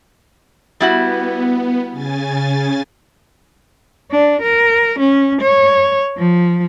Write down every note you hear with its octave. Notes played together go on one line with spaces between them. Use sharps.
G3 B3 E4 F#4
C#3 G#5 A6
D4
A#4
C#4
C#5
F3